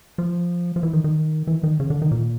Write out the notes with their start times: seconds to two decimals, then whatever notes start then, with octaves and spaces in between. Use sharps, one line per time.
0.18 F3
0.76 F3
0.83 E3
0.93 D#3
1.04 D#3
1.47 E3
1.63 D#3
1.80 C#3
1.90 D3
2.02 D#3
2.11 A#2